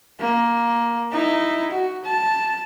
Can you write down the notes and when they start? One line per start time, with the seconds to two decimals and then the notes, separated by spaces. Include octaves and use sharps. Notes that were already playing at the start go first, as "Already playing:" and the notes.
0.20 A#3
1.12 D#4 E4
1.71 F#4
2.05 A5